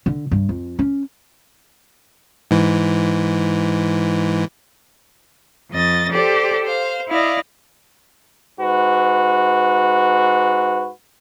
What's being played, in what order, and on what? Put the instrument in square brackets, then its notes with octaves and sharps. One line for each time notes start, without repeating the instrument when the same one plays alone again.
[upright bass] D3
G2
F2
C#4
[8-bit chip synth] G#2 E3
[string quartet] F2 D#5 A6
G4 A4 C5 D5
C5 F5
E4 D5 D#5 F5
[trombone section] G#2 F#4 B4